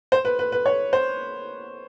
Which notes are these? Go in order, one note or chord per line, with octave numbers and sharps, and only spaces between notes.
C5
B4
B4
B4
C#5
C5